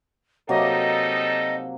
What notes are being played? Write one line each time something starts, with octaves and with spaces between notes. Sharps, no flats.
C3 F#3 G3 A#3 D#4 A4 D#5